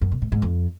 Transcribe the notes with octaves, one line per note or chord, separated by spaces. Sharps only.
F#2
B2
A2
G#2
F2